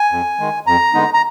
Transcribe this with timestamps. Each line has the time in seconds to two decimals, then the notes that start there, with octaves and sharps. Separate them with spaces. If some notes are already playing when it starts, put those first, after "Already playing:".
Already playing: G#5
0.12 F2
0.39 D#3 G#3
0.66 F2 A#5
0.94 D3 G#3 B3 D#4
1.14 A#5